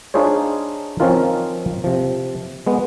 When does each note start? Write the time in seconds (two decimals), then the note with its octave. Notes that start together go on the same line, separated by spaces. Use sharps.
0.14 D4 D#4 F4 G#4 C5 C#5
1.00 F3 C4 C#4 D#4 F4 A#4
1.84 C3 F3
2.67 G#3 B3